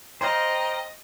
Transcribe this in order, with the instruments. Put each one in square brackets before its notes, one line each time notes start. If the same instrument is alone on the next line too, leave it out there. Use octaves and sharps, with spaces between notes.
[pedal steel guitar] C5 F5 [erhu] D#5 [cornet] G5 [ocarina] A#5